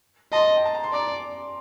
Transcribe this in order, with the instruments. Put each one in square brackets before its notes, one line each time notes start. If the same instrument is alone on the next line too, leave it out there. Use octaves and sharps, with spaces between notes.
[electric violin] D#5 [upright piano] A5 C6
[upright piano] G5
A5
A#5
C6
[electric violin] D5 [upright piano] A#5 D6